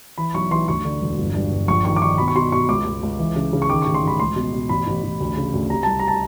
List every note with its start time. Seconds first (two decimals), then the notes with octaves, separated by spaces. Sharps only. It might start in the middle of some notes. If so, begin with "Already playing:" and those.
0.18 E3 B5
0.34 B1 C#6
0.51 E3 C6
0.68 D2 C#6
0.85 D3
1.02 E1
1.18 G1
1.35 G2
1.51 G1
1.68 A#1 C#6
1.85 D#3 C#6
1.96 D6
2.02 D#3 C#6
2.18 B2 B5
2.28 C#6
2.35 B2 C6
2.52 B2 C#6
2.69 C#2 D6
2.86 C#2
3.03 C#2
3.19 E3
3.36 C#3
3.53 C#3
3.62 C#6
3.70 D#3 D6
3.82 A1 C#6
3.94 C6
4.03 A1 B5
4.20 C#2 C6
4.36 B2
4.53 B2
4.69 A1 B5
4.87 A1
5.04 A1
5.20 D2
5.37 C#3
5.54 D2
5.70 C3 A#5
5.83 C2 A5
5.99 A#5
6.08 A5